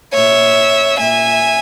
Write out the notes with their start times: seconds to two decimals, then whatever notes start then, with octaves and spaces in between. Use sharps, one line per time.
0.13 A#2 C#5 E5
0.99 A#2 E5 G#5